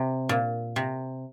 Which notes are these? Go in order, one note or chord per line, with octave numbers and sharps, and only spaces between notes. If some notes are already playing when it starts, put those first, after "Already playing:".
Already playing: C3
A#2
C3